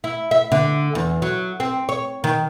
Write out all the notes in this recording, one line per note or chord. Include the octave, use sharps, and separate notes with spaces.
E4
E5
D3
E2
F#3
C4
C#5
D#3